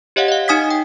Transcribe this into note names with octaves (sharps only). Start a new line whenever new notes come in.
G4 C#5 D#5 F5 F#5
D#5 F5
D#4 G#5 D#6 G#6 B6
G5